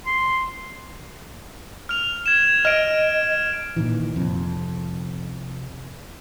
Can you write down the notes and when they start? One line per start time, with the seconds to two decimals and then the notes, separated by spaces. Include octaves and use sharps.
0.06 C6
1.89 F6 F7
2.26 G#6 E7
2.65 D#5 F6 D7
3.76 A#2 D#3 E3
4.16 F1 F2